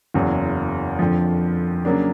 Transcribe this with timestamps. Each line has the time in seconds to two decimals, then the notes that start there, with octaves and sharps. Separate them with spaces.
0.14 F#1 E2 C#3 F#3
0.99 F2 D3 F3
1.85 C#3 F#3 A#3 D4